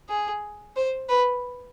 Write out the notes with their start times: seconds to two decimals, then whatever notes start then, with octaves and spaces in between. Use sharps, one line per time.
0.09 G#4
0.76 C5
1.09 B4